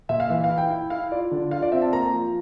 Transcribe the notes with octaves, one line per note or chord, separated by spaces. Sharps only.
A#2 E5
F5
E3 E5
F5
E4
G5
E4
E4 F5
F4 D5
D3
F4 F5
D5
C4 E5
A5
A#3 A#5
F3